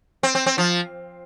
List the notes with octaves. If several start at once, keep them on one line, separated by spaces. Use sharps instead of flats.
C4
C4
C4
F3